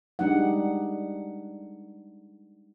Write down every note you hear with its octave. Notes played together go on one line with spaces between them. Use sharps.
G3 G#3 D4 D#4 F#5